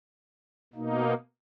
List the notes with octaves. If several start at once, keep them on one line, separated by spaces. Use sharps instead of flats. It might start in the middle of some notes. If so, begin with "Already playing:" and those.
B2 A#3 D#4